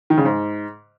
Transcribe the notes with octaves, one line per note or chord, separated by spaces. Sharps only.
D#3
C#3
G#2